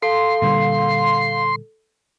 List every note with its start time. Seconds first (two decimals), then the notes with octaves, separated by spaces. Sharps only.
0.03 A4 F5 C6
0.42 A#2 D3 G3